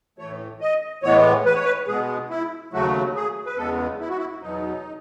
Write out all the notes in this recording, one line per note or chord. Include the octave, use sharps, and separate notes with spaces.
A2 E3 A3 C#5
D#5
A2 E3 G#3 B3 C#5
B4
C#5
B4
B2 G#3 B3 G#4
E4
D#2 C#3 F#3 A3 F#4
G#4
B4
E2 C#3 G#3 B3 A4
E4
F#4
E4
E2 B2 F#3 B3 D#4